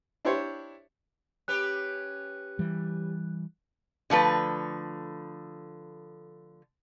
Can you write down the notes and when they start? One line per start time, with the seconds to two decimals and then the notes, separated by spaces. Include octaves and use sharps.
0.25 D4 E4 G4 C5 C#5 C6
1.48 C#4 G4 B4 F#6
2.59 E3 G3
4.10 D3 F3 A3 B4